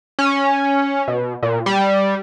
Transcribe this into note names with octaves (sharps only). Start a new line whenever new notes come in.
C#4
B2
A#2
G3